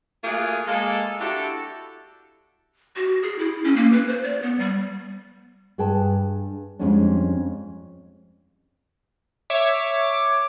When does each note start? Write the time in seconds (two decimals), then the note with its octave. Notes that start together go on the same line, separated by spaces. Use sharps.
0.23 F#3 A3 A#3 F4 G#4
0.67 G#3 A#3 A4
1.20 D4 E4 F#4 G4 A4
2.96 F#4
3.23 G#4
3.39 E4
3.64 C#4
3.76 A#3
3.92 B4
4.07 C5
4.23 D5
4.43 B3
4.59 G3
5.78 G2 G#4 B4 G5 A5
6.79 F2 G3 G#3 C#4 D4
9.50 C#5 E5 D6